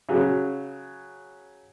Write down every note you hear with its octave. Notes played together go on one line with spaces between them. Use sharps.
C#3 F#3